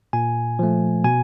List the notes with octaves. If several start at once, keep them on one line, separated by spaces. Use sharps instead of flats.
A#2 G#5
F3 A3
B2 G#5